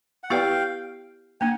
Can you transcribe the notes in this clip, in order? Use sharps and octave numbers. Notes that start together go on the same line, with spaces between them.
F#5
B3 E4 G4 B4 D5 F5 G5
A#3 D4 F#5 G#5